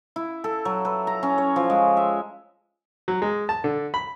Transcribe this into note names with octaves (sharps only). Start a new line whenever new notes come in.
E4
A4
F#3
B4
A#5
C#4
C#5
F3
G#3
E5
F#3
G#3
A5
D3
B5